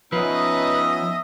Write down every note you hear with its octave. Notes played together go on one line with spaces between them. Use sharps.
F3 B3 C#4 D#4 B4 D#5 E5 D#6